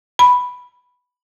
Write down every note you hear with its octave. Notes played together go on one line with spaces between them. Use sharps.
B5